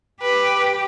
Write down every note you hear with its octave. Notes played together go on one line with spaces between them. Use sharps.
G4 B4